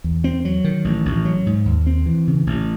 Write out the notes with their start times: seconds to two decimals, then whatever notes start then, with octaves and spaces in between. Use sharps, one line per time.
0.04 E2
0.24 C4
0.45 F#3
0.64 D#3
0.85 A1
1.05 A1
1.25 F#3
1.46 G#2
1.66 D#2
1.87 C4
2.06 E3
2.27 C#3
2.47 A1